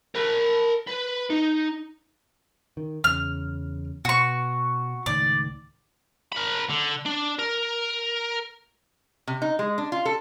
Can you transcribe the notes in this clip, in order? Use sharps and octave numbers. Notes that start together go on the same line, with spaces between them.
A#4 B5
B4
D#4
D#3
E2 C#3 F6
B2 B3 F#4 C#6
C#2 A2 D#3 D5
A#4 B5
D3
D4
A#4
C3
D#4
G#3
D4
F4
A4